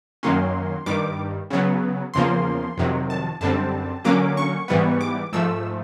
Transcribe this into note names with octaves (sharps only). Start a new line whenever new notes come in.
F#2 D#3 F#3 A#3 C#4 C6
G2 D#3 G3 D6
C#3 F#3 B3
E2 C#3 F3 A#3 C6
F2 C3 D#3 F#3
A5
F#2 D3 G3 C4 A5
D3 F#3 A#3 C#4 D6
C#6
G#2 E3 G3 B3
D6
G#2 F3 A3 E6